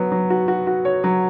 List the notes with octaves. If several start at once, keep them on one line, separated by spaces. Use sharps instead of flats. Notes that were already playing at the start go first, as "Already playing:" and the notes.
Already playing: F#3 B3
F#3
F#4
F#4
F#4
C#5
F#3